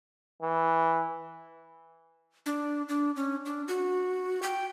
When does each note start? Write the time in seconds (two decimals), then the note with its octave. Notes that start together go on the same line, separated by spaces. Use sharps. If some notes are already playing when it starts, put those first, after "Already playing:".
0.42 E3
2.46 D4
2.89 D4
3.16 C#4
3.45 D4
3.68 F#4
4.43 G5